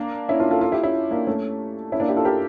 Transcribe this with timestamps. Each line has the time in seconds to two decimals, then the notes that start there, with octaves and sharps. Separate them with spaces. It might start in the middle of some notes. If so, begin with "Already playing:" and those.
Already playing: A#3 D4
0.29 C#4 E4
0.40 D4 F4
0.51 F4 A4
0.61 F4 A4
0.72 E4 G4
0.83 C#4 E4
1.11 A#3 D4
1.27 A3 C#4
1.92 C#4 E4
2.00 A#3 D4
2.08 E4 G4
2.16 F4 A4
2.25 G4 A#4